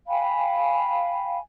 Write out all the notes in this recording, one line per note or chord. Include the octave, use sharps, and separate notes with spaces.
F5 G5 G#5 B5